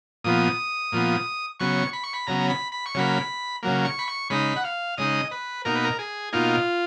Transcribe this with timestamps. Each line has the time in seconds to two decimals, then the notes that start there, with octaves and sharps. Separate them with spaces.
0.24 A#2 F3 B3 D#6
0.92 A#2 F3 B3
1.60 C#3 F#3 B3 C#6
1.93 B5
2.03 C#6
2.13 B5
2.27 C#3 F#3 B3 A#5
2.50 B5
2.72 B5
2.86 C#6
2.95 C#3 F#3 A#3 B5
3.63 C#3 F#3 A#3
3.85 C#6
3.99 B5
4.08 C#6
4.30 C#3 G#3 D#4 B5
4.56 F#5
4.64 F5
4.98 C#3 G#3 D#4 D#5
5.31 B4
5.65 B2 A#3 D#4 A#4
5.75 B4
5.85 A#4
5.99 G#4
6.33 B2 A#3 D#4 F4